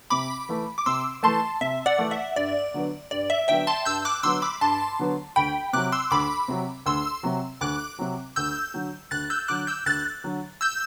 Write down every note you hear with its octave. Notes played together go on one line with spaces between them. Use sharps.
C3 B5 D6
E3 A3
D6
C3 C6 E6
E3 A3 A5 C6
C3 E5
D5 F#5
E3 A3
E5
G2 D5
D3 F#3 B3
G2 D5
E5
D3 F#3 B3 E5 G5
A5 C6
G2 E6 G6
D6 F#6
D3 F#3 B3 C6 E6
B5 D6
G2 A5 C6
D3 F#3 B3
D2 G5 B5
C3 F#3 D6 F#6
C6 E6
D2 B5 D6
C3 F#3
D2 C6 E6
C3 F#3
D2 D6 F#6
C3 F#3
D2 E6 G6
D3 F#3
D2 F#6 A6
E6 G6
D3 F#3 D6 F#6
E6 G6
D2 F#6 A6
D3 F#3
E6 G6